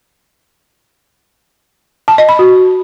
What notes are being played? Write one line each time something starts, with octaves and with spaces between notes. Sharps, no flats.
A5
D#5
B5
F#4